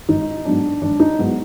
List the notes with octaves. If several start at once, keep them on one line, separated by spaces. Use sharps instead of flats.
G#1 D#4
G#2 F#3 B3 D4
G#1 D4
D#4
G#2 F#3 B3